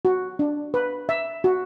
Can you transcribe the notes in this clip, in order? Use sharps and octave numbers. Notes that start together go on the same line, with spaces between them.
F#4
D4
B4
E5
F#4